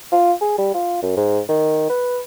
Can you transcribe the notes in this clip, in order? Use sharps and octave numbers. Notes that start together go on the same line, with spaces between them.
F4
G#4
G3
F4
F#2
G#2
D#3
B4